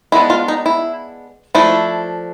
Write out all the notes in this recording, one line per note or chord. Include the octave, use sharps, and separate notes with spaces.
G#3 B3 D4 E4
F4
D#4
E4
F3 A3 D4 E4